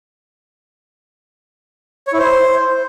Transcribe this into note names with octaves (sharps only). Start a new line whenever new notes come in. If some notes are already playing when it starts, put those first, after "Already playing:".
C#5
E4
C5